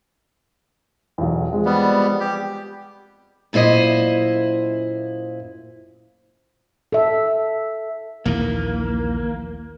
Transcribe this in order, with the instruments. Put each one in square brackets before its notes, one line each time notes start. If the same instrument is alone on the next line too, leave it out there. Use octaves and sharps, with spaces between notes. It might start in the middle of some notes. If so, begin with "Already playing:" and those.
[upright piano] B1 E2
F3 G#3 C4
[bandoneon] G3 B3
G4
[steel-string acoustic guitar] F#2 A#2 E4 C5 D#5
[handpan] A4 E5
[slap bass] A#1 D#2 E3 [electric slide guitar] A#3